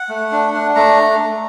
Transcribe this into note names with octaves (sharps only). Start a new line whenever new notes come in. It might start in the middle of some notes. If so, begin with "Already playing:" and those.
Already playing: F#5
A3
D4
D4
A3 A#5